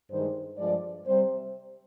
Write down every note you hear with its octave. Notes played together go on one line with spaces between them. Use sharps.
G2 D#3 G#3 C5
G2 F3 G#3 D5
C3 G3 C5